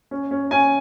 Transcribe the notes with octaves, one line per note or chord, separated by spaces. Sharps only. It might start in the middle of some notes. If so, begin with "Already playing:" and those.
C#4
C#4
C#4 G#5